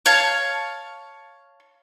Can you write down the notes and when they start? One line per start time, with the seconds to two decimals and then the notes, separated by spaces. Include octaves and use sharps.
0.06 C#5 F5 A5